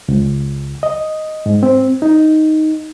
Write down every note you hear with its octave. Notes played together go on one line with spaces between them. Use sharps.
C#2
D#5
G#2
C4
D#4